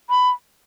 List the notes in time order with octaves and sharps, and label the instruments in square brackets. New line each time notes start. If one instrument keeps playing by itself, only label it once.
[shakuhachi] B5